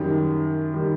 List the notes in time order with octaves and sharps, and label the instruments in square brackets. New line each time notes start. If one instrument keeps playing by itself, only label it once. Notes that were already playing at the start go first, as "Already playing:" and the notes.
Already playing: [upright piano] F#2 D#3 G3
D#3 G3